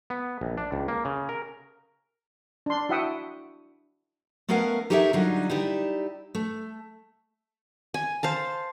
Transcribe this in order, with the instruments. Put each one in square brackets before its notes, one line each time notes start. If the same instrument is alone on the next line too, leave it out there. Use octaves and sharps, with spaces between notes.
[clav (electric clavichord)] B3
A#1
D4
C#2
A#3
C#3
A#4
[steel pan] D4 C6
E4 F#4 E5 F#5 G5 D#6
[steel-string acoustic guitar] A3 B3 C#4 A#4 F5 F#5
D#4 G4 A4 A#4 C#5 E5
D3 F#3 G3 D#4 F4
D#4 E4 G4 D5
A3
[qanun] G#5
C5 F5 A5